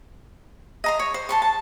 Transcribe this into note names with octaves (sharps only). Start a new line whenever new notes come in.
D#5 A#5 C6
C#5
C5
A5 C6 C#6
A5